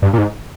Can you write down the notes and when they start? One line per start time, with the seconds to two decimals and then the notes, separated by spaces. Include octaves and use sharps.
0.02 G2
0.13 A#2
0.18 G#2